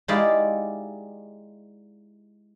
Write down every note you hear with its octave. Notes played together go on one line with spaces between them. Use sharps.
G#3 D#4 E4 G4 D5 F5